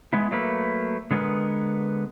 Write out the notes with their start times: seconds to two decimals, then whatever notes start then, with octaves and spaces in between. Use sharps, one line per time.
0.13 G#3 B3 E4
0.31 F#3 A3 A#3 B4
1.11 D3 G#3 B3 F#4 A#4 B4